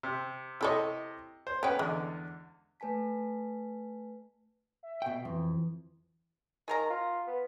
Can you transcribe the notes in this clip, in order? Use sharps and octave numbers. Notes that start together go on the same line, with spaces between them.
C3
C3 E4 A4 C#5 D#5
C5
B3 C#4 B4 F#5 G5
E2 D3 G#3
A3 B4 G#5 A5 B6
E5
B2 G5
F2 E3
D#3 G#4 A#4 A#5
F4
B3